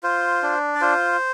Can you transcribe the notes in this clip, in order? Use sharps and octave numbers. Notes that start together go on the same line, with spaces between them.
F4 C5
D4
D5
F4 C5